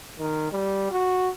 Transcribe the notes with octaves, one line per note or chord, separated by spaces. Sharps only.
D#3
G3
F#4